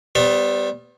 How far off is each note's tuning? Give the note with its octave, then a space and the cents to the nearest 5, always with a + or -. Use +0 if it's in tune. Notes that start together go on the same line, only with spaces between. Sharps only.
G3 +0 B3 +25 C5 +45